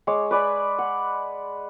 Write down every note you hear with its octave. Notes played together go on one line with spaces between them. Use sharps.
G#3 C#5 D6
B4 D5 G#5 B5
F#5